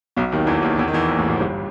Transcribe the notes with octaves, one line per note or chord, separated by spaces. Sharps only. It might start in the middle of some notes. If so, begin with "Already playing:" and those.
B1 B2
D#2 D#3
E2 E3
D#2 D#3
E2 E3
D#3
E2 E3
A#1 A#2
A1 A2
G#1 G#2
G1 G2